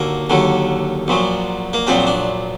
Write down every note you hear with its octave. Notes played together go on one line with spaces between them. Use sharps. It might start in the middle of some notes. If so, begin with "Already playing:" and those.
Already playing: D#2 D3 F#3 A#3
D#2 D3 F#3
A#1 A#2 F#3
A#3
A#1 A#2 F#3 C4
D4